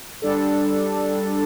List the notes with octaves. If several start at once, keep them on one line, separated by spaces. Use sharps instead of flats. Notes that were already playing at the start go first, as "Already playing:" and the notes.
G3 D4 A4